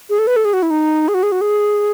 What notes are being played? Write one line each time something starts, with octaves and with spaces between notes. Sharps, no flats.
G#4
A4
B4
A4
G#4
F#4
E4
D#4
G#4
F#4
G#4
F#4
G#4